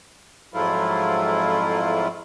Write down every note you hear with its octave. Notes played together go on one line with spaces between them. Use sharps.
F2 G#2 F#3 A3 E4 F4